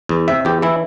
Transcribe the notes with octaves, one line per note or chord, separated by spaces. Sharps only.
E2
C3 E5
E2 G4
E3 E4